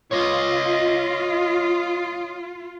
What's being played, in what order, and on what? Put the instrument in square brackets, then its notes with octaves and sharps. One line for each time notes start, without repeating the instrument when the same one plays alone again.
[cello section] F4 [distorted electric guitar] C#5 D#5